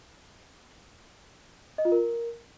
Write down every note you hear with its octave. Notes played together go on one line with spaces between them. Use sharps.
D#5
F4
A#4